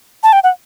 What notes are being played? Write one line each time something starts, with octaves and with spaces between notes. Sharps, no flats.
A5
G5
F#5